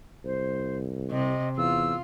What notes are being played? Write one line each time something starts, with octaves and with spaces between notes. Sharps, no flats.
C2 C5
C3 D#5
E2 F4 E6